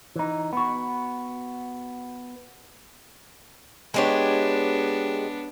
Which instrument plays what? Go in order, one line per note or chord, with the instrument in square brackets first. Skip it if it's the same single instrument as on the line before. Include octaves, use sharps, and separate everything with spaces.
[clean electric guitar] E3 D#4
B3 F#4
[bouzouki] G#3 G4 C#5 [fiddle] B3 D4